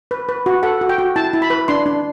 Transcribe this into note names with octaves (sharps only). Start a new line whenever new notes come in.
B4
B4
F#4
A4 F#5
F#4
G5
F#4
E4 A5
E4
B5
B4
D4 C6
D4